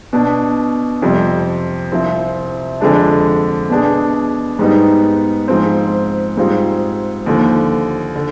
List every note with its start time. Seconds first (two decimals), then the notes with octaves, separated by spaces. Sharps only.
0.13 B2 B3 D4
1.02 F2 C3 G3
1.92 C2 C3 F3 C4
2.81 F2 D3 G#3 D4
3.69 B2 B3 D4 G#4
4.59 G#2 G3 B3 D#4
5.48 G#2 F3 C4
6.37 G#2 G3 C4 F4 G#4
7.26 D#2 D3 F3
8.16 D3